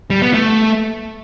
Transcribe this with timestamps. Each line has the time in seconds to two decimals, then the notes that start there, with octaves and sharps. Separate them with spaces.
0.10 G3
0.22 B3
0.34 A3